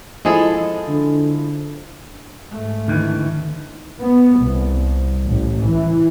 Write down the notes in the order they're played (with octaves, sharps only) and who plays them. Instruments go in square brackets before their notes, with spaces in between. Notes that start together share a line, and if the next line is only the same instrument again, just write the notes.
[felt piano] F3 E4 [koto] G#3 G#4 A4
[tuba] D3
[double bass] G#2 A3
[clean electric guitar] D2 D#3 E3
[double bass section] B3
C2
A1
E3